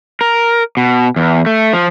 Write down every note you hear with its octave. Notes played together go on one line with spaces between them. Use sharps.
A#4
B2
E2
A3
F3